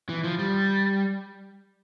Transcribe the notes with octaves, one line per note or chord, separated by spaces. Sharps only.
E3
F3
G3